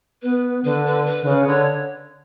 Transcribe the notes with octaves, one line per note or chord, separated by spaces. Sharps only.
B3 B4
D3 B4
B4
B4
D3
C#3 B4
D3 C#5